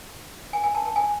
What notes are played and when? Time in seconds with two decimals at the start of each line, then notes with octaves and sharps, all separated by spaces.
0.53 G#5
0.64 G#5
0.75 A5
0.85 A5
0.96 G#5